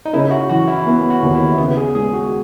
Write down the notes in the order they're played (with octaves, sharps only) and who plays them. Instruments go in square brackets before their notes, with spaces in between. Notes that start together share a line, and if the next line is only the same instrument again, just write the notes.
[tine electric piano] D#4
[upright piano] C#3 [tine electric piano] E4
[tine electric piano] F#4
[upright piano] E3 [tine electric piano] F#4
[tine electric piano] E4
[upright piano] B3
[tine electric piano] F#4
[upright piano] D#2
[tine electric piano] E4
[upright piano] C#3 [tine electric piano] B3
[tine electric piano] G#4
[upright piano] G#3 [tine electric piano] G#4
[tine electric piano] F#4